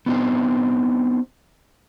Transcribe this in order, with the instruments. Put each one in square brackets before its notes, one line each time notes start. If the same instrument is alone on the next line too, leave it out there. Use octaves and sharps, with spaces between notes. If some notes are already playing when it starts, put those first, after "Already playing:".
[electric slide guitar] B3 C4 D4 D#4 G4 C5